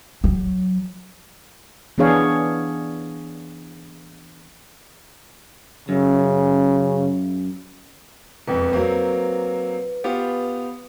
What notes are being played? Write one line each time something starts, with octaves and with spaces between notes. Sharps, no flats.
F#3
E3 B3 D4 G#4 C#5 F5
F#2 C#3
E1 F2 B4
F#3 A#3 C4
B3 F4 G4